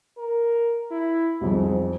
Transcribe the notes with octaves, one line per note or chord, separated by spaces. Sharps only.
A#4
E4
C2 F2 G#2